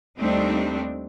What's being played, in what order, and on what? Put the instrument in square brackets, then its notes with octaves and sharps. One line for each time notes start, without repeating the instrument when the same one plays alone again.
[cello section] D#2 G3 A3 C4 D4 D#4